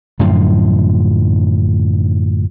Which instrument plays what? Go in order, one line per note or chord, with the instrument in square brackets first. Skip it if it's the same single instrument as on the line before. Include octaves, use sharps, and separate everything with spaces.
[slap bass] F#2 A2 D3 F3